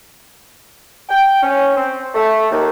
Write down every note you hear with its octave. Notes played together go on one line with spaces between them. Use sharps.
G5
C#4
C4
A3
D#2